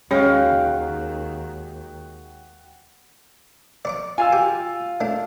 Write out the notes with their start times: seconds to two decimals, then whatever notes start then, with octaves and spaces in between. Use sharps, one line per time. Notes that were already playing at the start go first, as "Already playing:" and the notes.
0.11 D#2 D#3 G#3 C#4 F#4 C#5 F5 G5
3.85 D5 C#6 D6
4.18 F4 F5 G#5 E6
4.33 G4
5.01 A3 D4